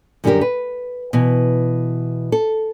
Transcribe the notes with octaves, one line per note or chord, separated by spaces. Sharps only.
F#2 D3 G3 E4 G4 A#4
B4
B2 E3
A4